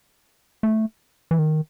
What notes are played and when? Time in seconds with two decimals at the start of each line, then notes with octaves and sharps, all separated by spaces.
0.63 A3
1.31 E3
1.39 D#3